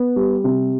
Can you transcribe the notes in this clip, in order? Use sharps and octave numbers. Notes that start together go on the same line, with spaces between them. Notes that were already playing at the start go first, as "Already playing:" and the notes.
Already playing: B3
G3
C3